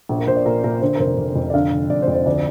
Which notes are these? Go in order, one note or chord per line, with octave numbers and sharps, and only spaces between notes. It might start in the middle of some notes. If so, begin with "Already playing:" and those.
A#1
A#4
A#1 C5
D5
A#2 A#4
A#2 A#4
D3 C5
A#4
F1 C5
F1
F2
D5
D3 F5
F1
F1 D5
C5
F2
C5
D2 D5